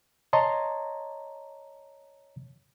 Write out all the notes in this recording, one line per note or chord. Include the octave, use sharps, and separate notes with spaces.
C#5 D#5 A5 A#5 C6